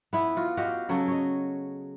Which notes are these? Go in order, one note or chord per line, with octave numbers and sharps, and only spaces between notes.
B3 E4
F4 F#4
F#4 G4 D#5 F5
C#3 F#3 F#4 A4
C#5 D#5